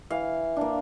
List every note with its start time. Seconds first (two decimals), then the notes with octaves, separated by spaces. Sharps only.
0.10 E3 F5
0.56 A#3 D4